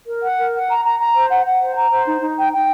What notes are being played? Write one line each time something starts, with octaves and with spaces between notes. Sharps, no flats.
A#4
F#5
A#4
F#5
A#5
A#5
A#5
C5
F#5
F#5
C5
A#5
C5
D#4
D#4
G5
G5